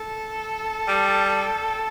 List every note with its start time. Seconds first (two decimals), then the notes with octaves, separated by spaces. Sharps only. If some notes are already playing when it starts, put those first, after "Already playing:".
Already playing: A4
0.88 G3